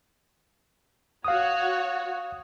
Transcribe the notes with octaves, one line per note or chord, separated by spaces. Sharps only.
F#4 C#5 F5 D#6